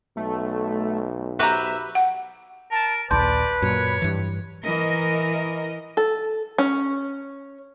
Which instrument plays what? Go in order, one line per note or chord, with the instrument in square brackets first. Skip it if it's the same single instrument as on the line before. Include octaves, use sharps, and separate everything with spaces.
[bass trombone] B1 [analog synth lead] A3
[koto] F#4 G4 B4 [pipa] C5 A#5 [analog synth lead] E5
[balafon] F#5
[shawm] A#4 [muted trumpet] A5
[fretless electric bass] A#1 D#2 [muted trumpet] B4 [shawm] D5 [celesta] A5 C6 G6
[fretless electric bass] F#2 A#2 [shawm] C#5
[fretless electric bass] G2 E3
[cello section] E3 A#4 D#5
[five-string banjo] A4
C#4